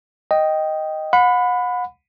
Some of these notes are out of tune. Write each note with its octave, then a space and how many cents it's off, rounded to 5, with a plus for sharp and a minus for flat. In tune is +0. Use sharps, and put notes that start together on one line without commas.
D#5 +0 G5 -5
F#5 -35 B5 +15